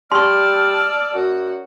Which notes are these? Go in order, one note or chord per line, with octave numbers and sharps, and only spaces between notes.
G3 D5 A5 C6 C#6 E6 F6
F#2 F#4